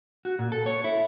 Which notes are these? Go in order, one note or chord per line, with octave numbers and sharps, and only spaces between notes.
F#4
A#2
A4
C#5
E4